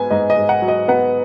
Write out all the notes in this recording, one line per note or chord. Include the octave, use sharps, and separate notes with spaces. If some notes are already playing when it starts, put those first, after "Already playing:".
Already playing: G#2 B3 G#5
G#2 D#5
D#5
G#2
F#5
F#3
D#5
B3 F#5